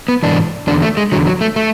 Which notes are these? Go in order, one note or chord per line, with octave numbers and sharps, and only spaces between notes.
B3
G#2 E3 D4
E2 D3 D4
A3
G#3
E2 D3 F#3
F#3
A3
A3